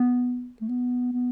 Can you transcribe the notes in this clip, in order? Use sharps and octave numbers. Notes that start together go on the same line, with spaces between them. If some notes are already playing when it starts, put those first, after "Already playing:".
Already playing: B3
A3
B3
B3